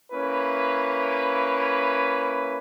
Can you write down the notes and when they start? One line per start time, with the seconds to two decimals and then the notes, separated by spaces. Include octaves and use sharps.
0.11 A#3 C#4 E4 B4